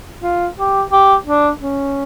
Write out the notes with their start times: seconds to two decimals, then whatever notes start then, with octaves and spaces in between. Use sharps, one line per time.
0.23 F4
0.58 G4
0.91 G4
1.26 D4
1.61 C#4